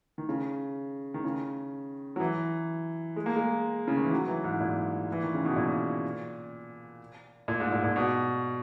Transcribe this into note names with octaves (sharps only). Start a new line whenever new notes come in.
D#3
C#3
D#3
C#3
F#3
E3
G#3
A#3
G#3
C#3
D#3
E3
F#3
E3
G#2
A#2
E3
D#3
C#3
B2
A#2
A#2
G#2
A#2
A#2
B2